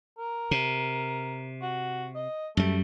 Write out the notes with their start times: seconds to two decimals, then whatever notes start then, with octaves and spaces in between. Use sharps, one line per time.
0.18 A#4
0.51 C3
1.62 F#4
2.15 D#5
2.57 F#2 G3 A3